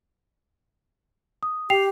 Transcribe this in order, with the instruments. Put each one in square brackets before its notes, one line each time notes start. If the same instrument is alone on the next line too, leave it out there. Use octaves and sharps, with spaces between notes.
[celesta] D#6
[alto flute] G4 [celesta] G5 C7 F7